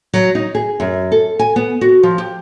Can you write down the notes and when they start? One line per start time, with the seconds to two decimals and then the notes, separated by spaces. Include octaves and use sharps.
0.14 F#3
0.35 D#4
0.55 G#4
0.80 F#2
1.12 A4
1.39 G#5
1.56 B3
1.81 F#4
2.03 F3
2.18 G4